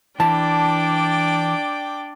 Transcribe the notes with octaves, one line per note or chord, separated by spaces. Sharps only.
E3 D4 D5 G5 A5 D6